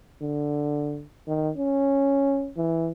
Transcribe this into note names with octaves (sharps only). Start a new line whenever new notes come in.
D3
D#3
C#4
E3